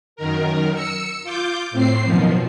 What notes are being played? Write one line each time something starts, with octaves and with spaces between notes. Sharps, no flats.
F#2 D#3 A#4
E6 C#7
F4 D6 G6
A2 C4 C7
F#2 B2 D#3 F3